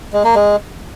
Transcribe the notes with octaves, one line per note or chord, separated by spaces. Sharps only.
G#3
A#3
G#3